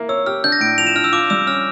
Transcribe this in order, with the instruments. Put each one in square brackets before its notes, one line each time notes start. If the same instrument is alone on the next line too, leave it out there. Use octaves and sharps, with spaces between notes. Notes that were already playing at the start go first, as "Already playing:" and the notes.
Already playing: [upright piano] A#3 E4
[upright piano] C#5 [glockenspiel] E6
[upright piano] G4 [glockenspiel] F6
[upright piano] D4 [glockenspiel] G6
[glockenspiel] A#6
[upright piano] A2 [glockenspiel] D7
[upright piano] F3 [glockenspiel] F7
[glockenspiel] E7
[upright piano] D4 [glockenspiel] F6
[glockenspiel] E6
[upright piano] F4 [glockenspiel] D6
[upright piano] G3 [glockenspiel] E6
[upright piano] C#4 [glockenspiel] F6